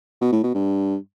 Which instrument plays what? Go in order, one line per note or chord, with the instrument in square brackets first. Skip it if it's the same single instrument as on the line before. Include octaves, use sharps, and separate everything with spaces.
[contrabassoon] B2
A2
B2
G2